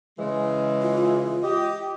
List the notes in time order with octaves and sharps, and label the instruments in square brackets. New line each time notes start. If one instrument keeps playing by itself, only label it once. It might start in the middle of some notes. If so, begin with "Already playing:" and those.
[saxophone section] C#3 E3 G#3
[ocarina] F4
[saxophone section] G4 D#5